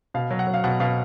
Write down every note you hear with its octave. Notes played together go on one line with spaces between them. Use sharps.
B2 F5
F#3
F#5
F#3
F5
B2 F#5
B2 F5